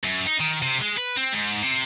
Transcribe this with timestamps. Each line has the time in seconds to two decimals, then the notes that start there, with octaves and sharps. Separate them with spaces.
0.04 F#2
0.27 D#4
0.40 D#3
0.62 C3
0.81 G#3
0.97 B4
1.17 C4
1.33 G#2
1.63 C3